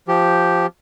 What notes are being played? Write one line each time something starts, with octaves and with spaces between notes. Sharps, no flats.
F3 G4